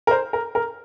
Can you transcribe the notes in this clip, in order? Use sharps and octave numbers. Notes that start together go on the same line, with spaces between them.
A#4
C5
A#4
A#4